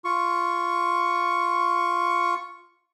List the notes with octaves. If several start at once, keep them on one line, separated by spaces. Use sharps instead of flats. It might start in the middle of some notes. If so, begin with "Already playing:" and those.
F4 C#6